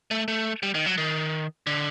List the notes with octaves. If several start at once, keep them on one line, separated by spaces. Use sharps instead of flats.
A3
A3
G3
D#3
F#3
D#3
D3